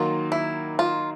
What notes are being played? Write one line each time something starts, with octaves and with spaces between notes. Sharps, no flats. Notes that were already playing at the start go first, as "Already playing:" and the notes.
Already playing: D#3 F#3 A#3 D#4 F4
E4
F4